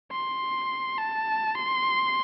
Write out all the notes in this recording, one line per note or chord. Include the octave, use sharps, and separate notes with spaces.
C6
A5
C6